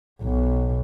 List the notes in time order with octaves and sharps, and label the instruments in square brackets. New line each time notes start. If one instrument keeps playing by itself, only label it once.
[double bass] B1 B2